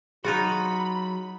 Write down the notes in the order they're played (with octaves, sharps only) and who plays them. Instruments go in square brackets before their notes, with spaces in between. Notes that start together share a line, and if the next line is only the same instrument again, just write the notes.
[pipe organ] F#3 [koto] D#4 F4 F#4 [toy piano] G#4 [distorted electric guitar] B5